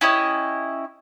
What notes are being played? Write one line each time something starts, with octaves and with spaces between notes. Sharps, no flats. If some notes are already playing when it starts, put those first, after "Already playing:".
C#4 E4 G4 D#5